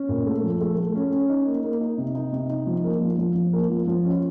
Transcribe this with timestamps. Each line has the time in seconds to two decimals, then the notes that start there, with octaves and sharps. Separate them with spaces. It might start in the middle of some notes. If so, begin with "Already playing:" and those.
Already playing: C#4
0.09 A#2
0.26 A3
0.43 F3
0.61 A3
0.77 A3
0.95 C#4
1.12 C#4
1.29 D#4
1.46 A#3
1.64 A#3
1.81 D#4
1.98 C3
2.15 D#4
2.32 C3
2.50 D#4
2.67 F3
2.84 A#3
3.01 F3
3.18 F3
3.35 F3
3.53 A#3
3.70 F3
3.87 F3
4.05 C#4